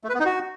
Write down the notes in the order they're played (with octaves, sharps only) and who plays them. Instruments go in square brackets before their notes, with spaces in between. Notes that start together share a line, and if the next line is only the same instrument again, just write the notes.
[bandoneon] A3
B4
B3
D#4
F#4